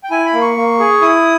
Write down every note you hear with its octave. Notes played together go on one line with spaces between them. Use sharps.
G5
E4 G#5
B5
A#3
C#6
A#3
G#4
E4 D#6